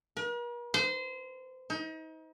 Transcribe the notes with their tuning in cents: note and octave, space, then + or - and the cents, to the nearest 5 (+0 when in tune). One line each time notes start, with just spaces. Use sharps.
A#4 +45
C5 -25
D#4 +35